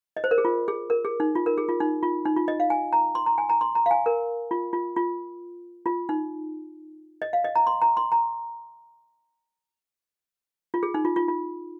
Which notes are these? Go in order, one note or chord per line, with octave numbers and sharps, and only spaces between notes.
D#5
C5
A#4
G#4
F4
G#4
A#4
G#4
D#4
F4
A#4
G#4
F4
D#4
F4
D#4
F4
D#5
F5
G#5
A#5
C6
A#5
G#5
A#5
C6
A#5
F5
G#5
A#4
F4
F4
F4
F4
D#4
D#5
F5
D#5
A#5
C6
A#5
C6
A#5
F4
G#4
D#4
F4
F4
F4